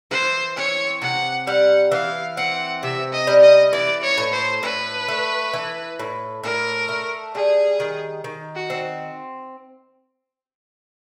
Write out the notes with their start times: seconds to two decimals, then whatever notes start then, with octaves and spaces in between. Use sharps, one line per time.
0.11 E3 C5
0.57 C4 C#5
1.01 C3 F#5
1.47 G3 F#5
1.92 E3 F5
2.37 C4 F#5
2.83 C3 E5
3.13 D#5
3.27 G3
3.43 D#5
3.73 E3 D5
4.03 C#5
4.17 A2
4.33 C5
4.63 A2 B4
5.08 A3
5.53 E3
5.99 A2
6.43 A2 A#4
6.89 A3
7.35 G3 G#4
7.80 D#3
8.24 D#3
8.55 F#4
8.70 C4